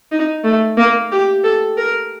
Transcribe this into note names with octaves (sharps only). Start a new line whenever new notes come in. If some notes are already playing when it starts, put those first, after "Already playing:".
D#4
A3
A#3
G4
A4
A#4